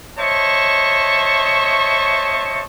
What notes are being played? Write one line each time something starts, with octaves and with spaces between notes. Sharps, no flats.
C5 C#5 D#5 E5 A5 C#6